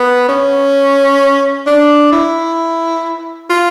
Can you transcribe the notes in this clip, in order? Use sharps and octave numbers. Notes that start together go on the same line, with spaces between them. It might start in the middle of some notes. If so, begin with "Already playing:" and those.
Already playing: B3
C#4
D4
E4
F4